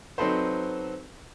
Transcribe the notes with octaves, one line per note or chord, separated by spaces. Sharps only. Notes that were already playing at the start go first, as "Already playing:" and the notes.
F#3 C4 D#4 A4 B4 C5